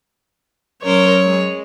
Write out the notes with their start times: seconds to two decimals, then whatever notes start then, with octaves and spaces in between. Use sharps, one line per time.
0.83 F#3 C#4 A#4 C5 C#5
1.24 G#3